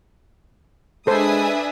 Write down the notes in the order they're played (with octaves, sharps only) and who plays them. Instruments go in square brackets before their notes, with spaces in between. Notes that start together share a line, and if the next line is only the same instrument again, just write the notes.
[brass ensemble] G#3 [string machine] D4 E5 [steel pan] A4 C5 [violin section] B4 G#5 D#6